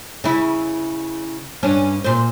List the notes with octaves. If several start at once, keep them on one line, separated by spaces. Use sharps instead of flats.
C#3 E4
G2 C#4 D4
A#2 C5